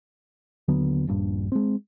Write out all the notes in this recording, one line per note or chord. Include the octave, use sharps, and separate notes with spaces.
D#2 D3 F#3 B3
D#1 A#1 G2
G#3 C4